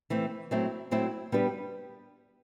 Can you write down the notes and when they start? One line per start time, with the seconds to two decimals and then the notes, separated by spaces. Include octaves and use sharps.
0.10 E3 A3 C4
0.51 F#3 A3 C4 E4
0.91 F#3 A3 C4 E4
1.32 G3 B3 D4 G4 B4